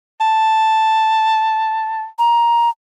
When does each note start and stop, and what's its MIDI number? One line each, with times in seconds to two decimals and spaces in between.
0.21 2.06 81
2.19 2.69 82